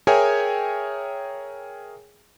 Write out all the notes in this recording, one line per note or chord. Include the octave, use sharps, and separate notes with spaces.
G#4 A#4 C#5 E5 G5 G#5